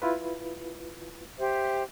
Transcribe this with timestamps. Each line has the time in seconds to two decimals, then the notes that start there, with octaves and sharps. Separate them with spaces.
0.02 E4 F4 B4
1.38 G4 C5 E5